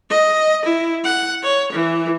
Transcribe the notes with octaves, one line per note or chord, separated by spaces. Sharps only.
D#5
E4
F#5
C#5
E3